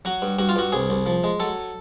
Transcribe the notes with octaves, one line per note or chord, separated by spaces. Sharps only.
F#3 F#4
G2
G2 F#4
F4
G2 F#4
C2 G#4
C2
F3
G#3
F#3 A4